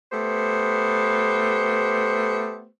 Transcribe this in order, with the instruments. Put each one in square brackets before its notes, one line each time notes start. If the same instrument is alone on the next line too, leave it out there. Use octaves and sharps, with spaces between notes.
[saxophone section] A3 B3 G4 C5